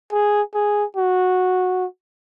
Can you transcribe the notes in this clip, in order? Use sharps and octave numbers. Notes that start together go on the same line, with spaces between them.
G#4
G#4
F#4